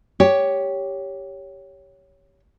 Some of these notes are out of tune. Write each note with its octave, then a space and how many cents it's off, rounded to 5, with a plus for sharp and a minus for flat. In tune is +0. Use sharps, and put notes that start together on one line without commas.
G4 +0 C#5 +10